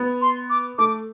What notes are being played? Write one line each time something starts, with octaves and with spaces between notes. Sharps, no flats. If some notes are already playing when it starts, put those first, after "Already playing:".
Already playing: B3
C6
D6
A3 D6